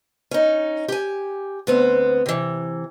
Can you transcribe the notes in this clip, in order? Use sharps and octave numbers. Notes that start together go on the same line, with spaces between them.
C#4 D#4
G4 G#5
D2 B3 C4
C3 E3